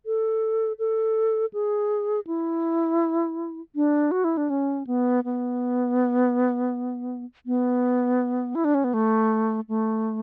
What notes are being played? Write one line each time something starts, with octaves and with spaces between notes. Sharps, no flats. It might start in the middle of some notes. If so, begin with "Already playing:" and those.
A4
A4
G#4
E4
D4
F#4
E4
D4
C#4
B3
B3
B3
E4
D4
C#4
B3
A3
A3